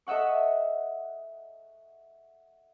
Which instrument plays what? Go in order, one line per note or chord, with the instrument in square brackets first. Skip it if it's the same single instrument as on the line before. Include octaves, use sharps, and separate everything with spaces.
[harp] A4 D#5 E5 F#5 C#6